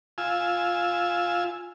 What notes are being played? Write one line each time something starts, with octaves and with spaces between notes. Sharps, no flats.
F4 G#5 E6